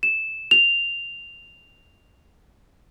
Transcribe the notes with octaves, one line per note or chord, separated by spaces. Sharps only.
E7
F7